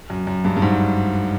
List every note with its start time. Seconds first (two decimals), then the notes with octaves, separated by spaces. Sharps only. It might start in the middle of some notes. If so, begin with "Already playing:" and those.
0.10 F#2
0.27 F#2
0.44 G2
0.57 G2
0.62 G#2